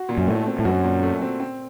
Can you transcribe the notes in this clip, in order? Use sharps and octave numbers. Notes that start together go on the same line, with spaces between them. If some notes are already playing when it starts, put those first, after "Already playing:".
Already playing: F#4
A#2
F#2
A2 A3
C4
A2
F#2 F#4
A#2
A3
C4
C4